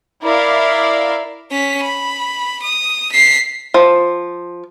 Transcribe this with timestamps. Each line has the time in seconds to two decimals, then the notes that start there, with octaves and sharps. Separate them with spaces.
0.23 E4 A#4 D5 F5
1.51 C#4 B6
1.83 B5
2.63 D#6
3.12 B6 C7
3.74 F3